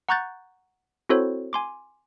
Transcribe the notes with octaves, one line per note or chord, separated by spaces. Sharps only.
F#5 A#5 C#6 F#6 G6 A6
C4 E4 F#4 A4 C5 C#5
G#5 C6 D6